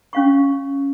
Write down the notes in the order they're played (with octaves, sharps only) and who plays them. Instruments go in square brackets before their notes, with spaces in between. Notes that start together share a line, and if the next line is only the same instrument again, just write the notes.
[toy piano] C#4 F5 C#6